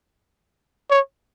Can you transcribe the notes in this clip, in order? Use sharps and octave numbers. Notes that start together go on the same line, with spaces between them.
C#5